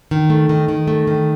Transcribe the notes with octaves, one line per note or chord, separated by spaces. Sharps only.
D#3
A3
D#3
D#3
A3
D#3